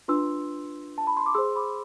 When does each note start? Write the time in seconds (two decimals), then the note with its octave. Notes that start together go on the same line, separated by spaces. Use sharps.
0.08 D4 F4 B4 C6 E6
0.98 A5
1.07 B5
1.17 C6
1.26 D6
1.34 G#4 C5 C6 E6
1.56 B5 D6